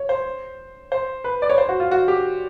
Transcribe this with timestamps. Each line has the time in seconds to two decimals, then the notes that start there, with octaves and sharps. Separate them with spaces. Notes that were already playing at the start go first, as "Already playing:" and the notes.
Already playing: C#5
0.09 C5
0.92 C5
1.24 B4
1.42 D5
1.50 C#5
1.58 C5
1.69 F#4
1.80 F4
1.91 F#4
2.08 G4